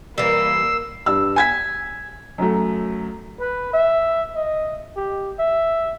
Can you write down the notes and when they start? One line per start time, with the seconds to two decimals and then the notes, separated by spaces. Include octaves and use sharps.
0.18 E3 G3 A#3 E6 C7
1.06 G2 E6
1.36 G#5 G#6 B6
2.38 F#2 F#3 A3
3.40 B4
3.73 E5
4.36 D#5
4.96 G4
5.39 E5